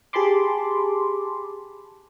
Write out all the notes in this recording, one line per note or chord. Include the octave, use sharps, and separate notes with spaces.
G4 G#4 A5 B5 C6 D6